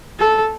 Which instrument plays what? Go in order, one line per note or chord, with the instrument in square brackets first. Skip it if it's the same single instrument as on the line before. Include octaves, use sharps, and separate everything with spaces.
[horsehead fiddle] A4